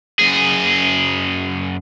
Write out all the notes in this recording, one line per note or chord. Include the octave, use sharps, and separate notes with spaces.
F#2 G#4